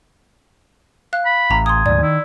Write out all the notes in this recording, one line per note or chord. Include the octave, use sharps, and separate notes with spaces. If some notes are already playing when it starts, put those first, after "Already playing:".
F5 F#6
B5
A1 A#5
G#5 C6 D#6
D2 G#2 D5
D#3 E4